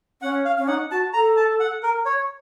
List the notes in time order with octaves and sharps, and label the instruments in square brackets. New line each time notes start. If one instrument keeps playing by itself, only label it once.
[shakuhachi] C#4 [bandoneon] F#5
[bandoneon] F5
[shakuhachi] C#4
[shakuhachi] D#4 [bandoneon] F#5
[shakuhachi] F#4 [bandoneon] A5
[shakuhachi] A4 [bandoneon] A#5
[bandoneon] A5
F#5
A#4
C#5